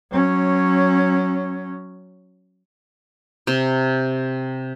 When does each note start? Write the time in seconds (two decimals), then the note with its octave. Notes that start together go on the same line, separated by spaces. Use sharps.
0.11 F#3 C#4
3.47 C3